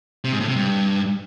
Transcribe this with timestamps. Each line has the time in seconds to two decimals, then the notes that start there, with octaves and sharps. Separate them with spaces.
0.24 C3
0.32 G#2
0.40 A2
0.48 C3
0.56 G2